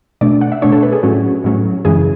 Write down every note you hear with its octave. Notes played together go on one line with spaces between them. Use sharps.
B2 A3 D4 D5
F#5
E5
B2 A3 D4 C#5
A4
B4
G#4
A2 F#3 C#4 F#4
A2 F#3 C#4
F#2 C#3 E3 G#3 G#4